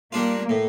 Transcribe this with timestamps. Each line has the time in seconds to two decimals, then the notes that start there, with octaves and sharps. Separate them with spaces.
0.12 G3 A#3 D4 F4
0.49 A2